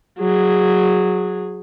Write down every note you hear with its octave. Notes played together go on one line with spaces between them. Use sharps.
F#3 G#4